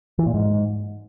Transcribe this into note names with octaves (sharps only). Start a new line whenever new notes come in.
E3
A#2
G#2